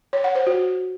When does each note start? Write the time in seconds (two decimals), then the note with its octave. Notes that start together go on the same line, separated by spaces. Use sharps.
0.13 C#5
0.24 F#5
0.35 C5
0.47 F#4